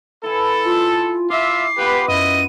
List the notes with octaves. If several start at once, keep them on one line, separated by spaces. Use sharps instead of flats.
E4 A4 B4 G#5
F4
F4 E5 D6 C7
B3 F4 G4 B4 F#5
F#2 E4 B4 D#5 D#7